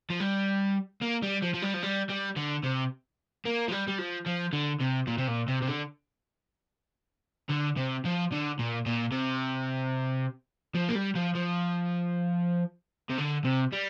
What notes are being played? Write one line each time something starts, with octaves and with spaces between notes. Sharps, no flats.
F3
G3
A#3
G3
F3
F3
G3
F3
G3
G3
D3
C3
A#3
F3
G3
G3
F3
F3
D3
C3
A#2
C3
A#2
C3
C3
D3
D3
C3
F3
D3
A#2
A#2
C3
F3
A#3
G3
F3
F3
C3
D3
C3
G3